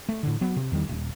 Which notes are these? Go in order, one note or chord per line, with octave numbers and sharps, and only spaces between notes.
A3
A2 D3
F#3 B3
C3
E2 D#3 G3
D#1